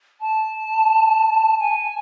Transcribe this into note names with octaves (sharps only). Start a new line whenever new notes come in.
A5
G#5